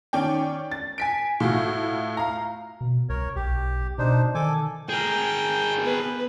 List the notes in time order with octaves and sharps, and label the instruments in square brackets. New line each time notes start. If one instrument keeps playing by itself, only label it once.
[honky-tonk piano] D#3 C#4 D5 G5
A6
G#5 B6 D7
A2 F4 F#4
F5 A#5
[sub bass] B2
[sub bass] C2 [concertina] A#4 C#5
[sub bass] B1 [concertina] G4
[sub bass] B2 [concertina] D4 D#4 C5
[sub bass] D#3 [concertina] A4 G#5 D6
[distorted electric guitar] G#4 A#4 [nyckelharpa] G5
[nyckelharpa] B3 B4